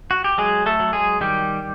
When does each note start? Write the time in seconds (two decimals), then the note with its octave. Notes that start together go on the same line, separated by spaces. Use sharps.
0.11 F#4
0.24 G4
0.38 F#3 G#3 G#4
0.66 A3 A4
0.80 F#3
0.93 G#3 G#4
1.21 D#3 G3 G4